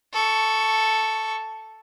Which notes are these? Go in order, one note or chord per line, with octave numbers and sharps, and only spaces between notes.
A4 C#6